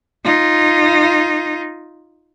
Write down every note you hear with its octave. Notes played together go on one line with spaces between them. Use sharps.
D#4 F4